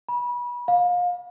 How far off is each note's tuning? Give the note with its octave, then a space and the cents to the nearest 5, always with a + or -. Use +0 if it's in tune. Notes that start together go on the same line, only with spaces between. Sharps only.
B5 -30
F5 +30